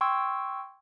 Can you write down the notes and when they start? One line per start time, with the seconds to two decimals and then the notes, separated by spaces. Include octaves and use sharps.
0.01 G5 C6 C#6 E6 G#6